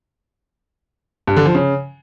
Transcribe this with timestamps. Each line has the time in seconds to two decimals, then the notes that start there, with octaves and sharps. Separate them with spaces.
1.27 G2
1.37 D3
1.46 F3
1.55 C#3